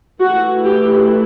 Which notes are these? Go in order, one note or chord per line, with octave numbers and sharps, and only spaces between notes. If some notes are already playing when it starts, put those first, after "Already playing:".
E3 A3 E4 F#4
G4